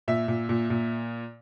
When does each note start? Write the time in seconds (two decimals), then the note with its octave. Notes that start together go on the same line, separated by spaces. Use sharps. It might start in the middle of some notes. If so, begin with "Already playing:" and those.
0.08 A#2 E5
0.28 A#2
0.49 A#2
0.70 A#2